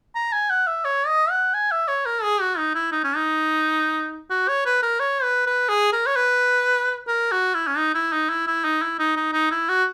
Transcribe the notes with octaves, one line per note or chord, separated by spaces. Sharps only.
A#5
G#5
F#5
E5
C#5
D#5
F#5
G#5
E5
C#5
A#4
G#4
F#4
D#4
E4
D#4
C#4
D#4
F#4
C#5
B4
A#4
C#5
B4
B4
G#4
A#4
C#5
B4
A#4
F#4
E4
C#4
D#4
E4
D#4
E4
E4
D#4
E4
D#4
D#4
D#4
E4
F#4